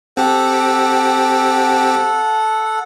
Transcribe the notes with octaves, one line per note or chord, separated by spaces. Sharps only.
C4 G4 A4 F#5